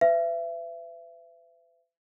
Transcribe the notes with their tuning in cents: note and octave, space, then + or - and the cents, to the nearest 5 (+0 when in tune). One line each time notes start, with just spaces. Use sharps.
B4 +45 E5 +30